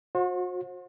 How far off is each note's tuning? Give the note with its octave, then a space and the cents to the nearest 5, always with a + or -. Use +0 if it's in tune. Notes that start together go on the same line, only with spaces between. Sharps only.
F#4 -40 C5 +35